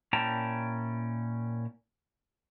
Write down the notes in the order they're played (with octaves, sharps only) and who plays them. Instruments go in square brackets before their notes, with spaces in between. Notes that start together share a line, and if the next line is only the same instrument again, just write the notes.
[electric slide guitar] A#2 C#4 E4 G5 A5 A#5